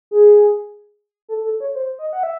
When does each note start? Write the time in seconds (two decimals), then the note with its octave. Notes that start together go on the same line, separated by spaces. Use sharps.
0.11 G#4
1.29 A4
1.44 A4
1.60 C#5
1.75 C5
1.99 D#5
2.13 F#5
2.23 E5